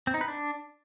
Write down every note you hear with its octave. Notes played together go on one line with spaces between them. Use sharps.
C4
D#4
B4
D4